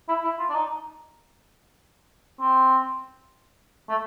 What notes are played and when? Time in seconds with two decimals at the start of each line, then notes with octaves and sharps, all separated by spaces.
0.08 E4
0.24 E4
0.39 F4
0.49 D4
0.55 D#4
2.40 C4
3.89 A3